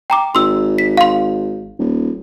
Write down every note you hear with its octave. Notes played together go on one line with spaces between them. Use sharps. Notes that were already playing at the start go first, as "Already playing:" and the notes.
G5 A#5 D6
G#1 C6 E6
B6
F5 C6
D#1